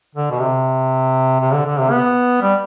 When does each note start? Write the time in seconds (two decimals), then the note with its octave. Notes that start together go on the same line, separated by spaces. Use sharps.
0.15 D3
0.31 B2
0.39 C3
1.40 C3
1.53 D3
1.66 D3
1.79 C3
1.91 B3
2.42 G3